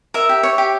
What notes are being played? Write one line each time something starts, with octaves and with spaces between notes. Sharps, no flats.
A#4 E5
G4
C#5
G4